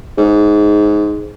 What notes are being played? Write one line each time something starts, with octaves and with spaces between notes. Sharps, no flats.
G#2